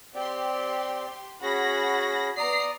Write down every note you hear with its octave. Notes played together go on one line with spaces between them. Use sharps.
C4 G4 D5 C6
C#4 F#4 G#4 B5 A#6
B3 D5 A#5 D#6 C7